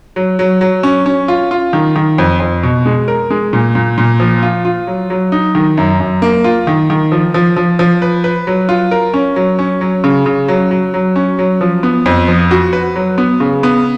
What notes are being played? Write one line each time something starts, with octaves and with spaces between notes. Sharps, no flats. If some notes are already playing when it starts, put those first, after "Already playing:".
F#3
F#3
F#3
C#4
C#4
F4
F4
D#3
D#3
F2
F2
B2
G#3
A#4
G#3
A#2
A#2
A#2
F3
F4
F4
F#3
F#3
D#4
D#3
F#2
F#2
A#3
F4
D#3
D#3
F3
F3
F3
F3
B4
B4
F#3
F4
A#4
C#4
F#3
C#4
F#3
C#3
C#3
F#3
F#3
F#3
C#4
F#3
F3
B3
F2
F3
F#4
B4
F#3
B3
C#3
B3